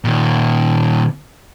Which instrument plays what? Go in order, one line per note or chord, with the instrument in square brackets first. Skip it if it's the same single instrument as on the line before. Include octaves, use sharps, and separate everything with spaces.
[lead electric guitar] A#2 D#3